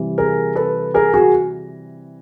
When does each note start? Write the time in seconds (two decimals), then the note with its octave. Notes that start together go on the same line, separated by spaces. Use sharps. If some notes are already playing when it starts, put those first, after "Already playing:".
Already playing: C3 E3 G3
0.18 G#4 A#4
0.56 A4 B4
0.94 G#4 A#4
1.14 F#4 G#4